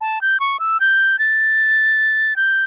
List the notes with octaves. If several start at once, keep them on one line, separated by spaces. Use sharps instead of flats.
A5
G6
C#6
E6
G6
A6
G6